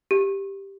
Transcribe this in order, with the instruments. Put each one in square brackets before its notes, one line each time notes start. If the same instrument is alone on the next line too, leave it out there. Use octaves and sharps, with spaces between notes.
[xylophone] G4